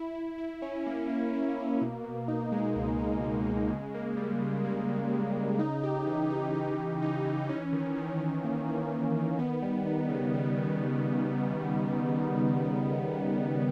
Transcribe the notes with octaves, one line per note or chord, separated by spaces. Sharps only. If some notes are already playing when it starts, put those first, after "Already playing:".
Already playing: E4
E4
E4
C#4
A#3
A#3
E4
A#3
B2
B2
D#4
G#3
C#2
D#4
B2
G#3
C#3
A#3
G3
C#3
A#3
C#3
C#3
C#3
D#4
G4
E3
D#4
G4
D#4
D#4
E3
C#4
D#3
D#3
C#4
A#3
A#3
D#3
D#3
B3
G3
D#4
C#3
G3
C#3